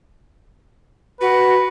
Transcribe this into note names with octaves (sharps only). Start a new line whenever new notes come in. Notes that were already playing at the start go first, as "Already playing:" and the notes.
F#4 B4